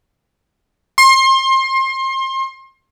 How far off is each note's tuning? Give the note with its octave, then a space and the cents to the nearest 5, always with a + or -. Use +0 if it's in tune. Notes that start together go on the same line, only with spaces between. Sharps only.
C6 +30